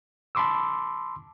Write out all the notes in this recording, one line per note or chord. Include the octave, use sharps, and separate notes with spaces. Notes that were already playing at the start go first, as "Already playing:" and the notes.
A5 B5 C6 D6 E6